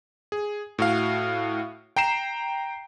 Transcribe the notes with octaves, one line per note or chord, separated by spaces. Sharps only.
G#4
A2 F#4 F5
G5 A#5 C7 E7